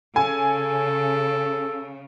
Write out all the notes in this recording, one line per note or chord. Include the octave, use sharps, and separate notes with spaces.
C#3 A4 G#5